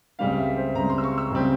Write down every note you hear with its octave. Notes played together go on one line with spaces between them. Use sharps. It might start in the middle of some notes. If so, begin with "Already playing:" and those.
C#2 C#3 G3 C4 F5
E5
C5
C#2 C#3 G3 C4 A#5
C6
E6
C#6
E6
C#2 C#3 G3 C4